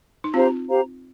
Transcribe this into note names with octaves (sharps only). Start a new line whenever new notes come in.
D#4
C4 F4 G4 C5 F5 A#5
G4 C5 F5 A#5